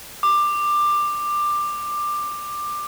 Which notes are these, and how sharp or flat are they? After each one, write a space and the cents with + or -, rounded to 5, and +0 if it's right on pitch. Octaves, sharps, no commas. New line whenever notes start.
D6 +15